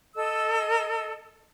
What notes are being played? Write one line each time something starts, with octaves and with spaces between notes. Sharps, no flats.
A4 D#5 E6